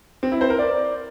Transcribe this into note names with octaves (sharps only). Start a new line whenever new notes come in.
C4
E4
C5
A#4
D5